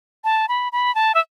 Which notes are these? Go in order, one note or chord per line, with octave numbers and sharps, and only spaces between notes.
A5
B5
B5
A5
E5